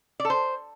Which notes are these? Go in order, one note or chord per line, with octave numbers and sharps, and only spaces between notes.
D5
A4
C5